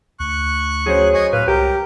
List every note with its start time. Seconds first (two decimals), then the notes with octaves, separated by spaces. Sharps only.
0.20 D2 C#6 F#6
0.86 F#3 C#4 G#4 C5
1.14 D#5 G#5 C#6
1.33 A2 B4 F5
1.48 C2 G4 A#4